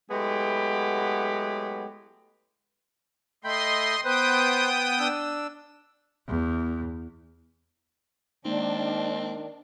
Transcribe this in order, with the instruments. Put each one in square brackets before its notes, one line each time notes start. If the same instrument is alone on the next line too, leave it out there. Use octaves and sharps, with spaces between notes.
[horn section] F#3 G#3 A3 B3 E4 G4
[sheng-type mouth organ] A3 G5 B5 [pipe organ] D#5 C6
[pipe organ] B3 G5 D#6 [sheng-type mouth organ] B4 C5
[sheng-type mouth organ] D4 E6
[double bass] E2
[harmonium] D#3 [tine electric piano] G#3 A#3 D#4 [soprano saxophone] C4 [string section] D4